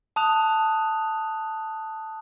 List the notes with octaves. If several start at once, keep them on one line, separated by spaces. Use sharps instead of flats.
A5 D#6 F#6 F7